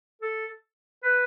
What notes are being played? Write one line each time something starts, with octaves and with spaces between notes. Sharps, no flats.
A4
B4